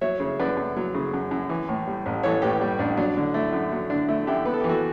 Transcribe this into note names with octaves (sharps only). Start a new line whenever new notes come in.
F#3 C#5 E5
C#3
F#2 B4 D5
F#2
F#3
C#3
F#2
F#2
E3
A2
G3
A1
E3 A4 C#5
A2 G4 B4
G3
A1 D4
F#3 D4
D3
A3 E4
F#2
F#3
D3 D4
A3 E4
F#2 E4 G4
B3 B4
A4
G4
E3
F#4 A4